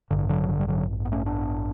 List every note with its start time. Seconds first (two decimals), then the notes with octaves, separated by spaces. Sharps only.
0.11 A1 G2 D3
0.29 D3 F#3
0.49 D3
0.59 G3
0.68 D3 F#3
1.05 B3
1.12 A3 C#4
1.26 B3 D4